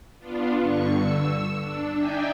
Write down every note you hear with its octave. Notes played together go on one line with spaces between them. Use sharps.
B3 D4 F4
G2 D3 C#6 C#7
E6
D4
D#4 D5 E5 G5 G#5